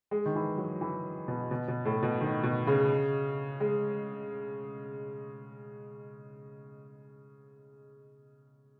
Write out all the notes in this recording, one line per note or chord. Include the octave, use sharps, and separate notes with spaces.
G#3
D#3
E3
F#3
E3
B2
B2
B2
A2
B2
D#3
B2
C#3
G#3